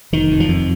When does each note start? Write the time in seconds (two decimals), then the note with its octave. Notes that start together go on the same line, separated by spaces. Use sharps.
0.13 F1 D#3
0.31 F2
0.40 F3
0.49 F2